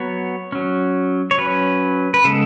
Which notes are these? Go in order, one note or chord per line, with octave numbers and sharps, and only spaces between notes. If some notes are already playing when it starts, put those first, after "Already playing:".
Already playing: F#3 B3 C#5
F#3 C#4
C#5
F#3 C#4 B4
B4
C#3 G#3 B3 A4